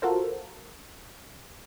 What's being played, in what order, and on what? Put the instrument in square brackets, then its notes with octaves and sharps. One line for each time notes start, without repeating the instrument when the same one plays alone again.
[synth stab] F4 F#4 A4 A#4 C5